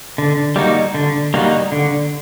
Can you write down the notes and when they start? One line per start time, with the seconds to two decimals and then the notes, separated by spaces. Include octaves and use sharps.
0.18 D3
0.56 G3 A#3 D#4 F#4
0.94 D3
1.34 G3 A#3 D#4 F#4
1.72 D3